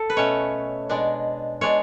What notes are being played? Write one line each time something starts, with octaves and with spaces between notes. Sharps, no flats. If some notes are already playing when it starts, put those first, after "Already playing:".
Already playing: A4
B4
B2 A3 C#4 C#5
B2 G#3 D4
B2 G#3 D4 C#5